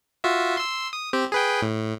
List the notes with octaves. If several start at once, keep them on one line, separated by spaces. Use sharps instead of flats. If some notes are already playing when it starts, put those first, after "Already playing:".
F4 F#4 E5
C6 E6
D#6
C4 G4
G#4 B4 G5
A2